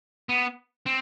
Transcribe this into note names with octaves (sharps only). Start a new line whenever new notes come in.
B3
C4